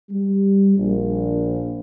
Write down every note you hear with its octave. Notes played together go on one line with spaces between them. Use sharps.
G3
A#1